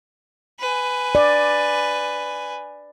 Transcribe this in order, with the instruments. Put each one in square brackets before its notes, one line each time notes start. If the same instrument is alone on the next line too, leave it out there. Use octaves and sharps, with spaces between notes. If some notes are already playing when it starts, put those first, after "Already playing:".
[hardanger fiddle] B4 G#5
[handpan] D5